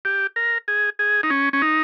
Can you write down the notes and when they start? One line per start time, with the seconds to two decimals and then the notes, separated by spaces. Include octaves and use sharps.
0.05 G4
0.36 A#4
0.68 G#4
0.99 G#4
1.23 D#4
1.30 C#4
1.53 C#4
1.62 D#4